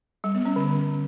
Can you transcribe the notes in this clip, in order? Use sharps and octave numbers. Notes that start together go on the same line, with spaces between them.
G3
B3
C#4
D3